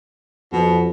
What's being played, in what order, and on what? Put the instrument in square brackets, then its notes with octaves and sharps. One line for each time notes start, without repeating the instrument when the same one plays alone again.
[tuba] F2 [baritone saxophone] B2